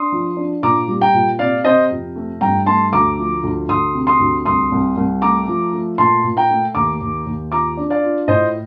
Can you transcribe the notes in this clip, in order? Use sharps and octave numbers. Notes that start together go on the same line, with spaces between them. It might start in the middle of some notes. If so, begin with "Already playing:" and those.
Already playing: D4 C6 D#6
F3
D4
A#2 A#5 D6
G3
G5 A#5
A#2
C3 D5 F5
C3 C5 D#5
F2
A3
G2 G5 A#5
A3 A5 C6
D2 A#5 D6
F3
D2
D2 C6 D#6
C3
C6 D#6
D2
C2 C6 D#6
C2
C2
A3 A#5 D6
F3
A3
A#2 A5 C6
A#2
G5 A#5
A3
D#2 A#5 D6
D#2
D#2
F4 A#5 D6
D4
D5 F5
F4
A2 C5 D#5